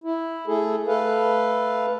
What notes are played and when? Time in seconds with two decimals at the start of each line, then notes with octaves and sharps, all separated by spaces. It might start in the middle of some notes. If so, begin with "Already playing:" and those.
0.04 E4
0.47 A3 G#4 A4
0.87 A3 A4 B4 F5